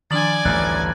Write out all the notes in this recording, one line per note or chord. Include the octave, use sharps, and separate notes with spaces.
D#3 F3 D4 D5 G#5 A6 F#7
A1 D2 G2 A#5 F#6 G#6